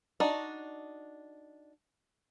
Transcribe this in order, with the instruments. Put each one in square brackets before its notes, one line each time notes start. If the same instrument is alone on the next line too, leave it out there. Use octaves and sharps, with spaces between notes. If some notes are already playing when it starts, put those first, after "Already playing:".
[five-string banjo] D4 D#4 F#4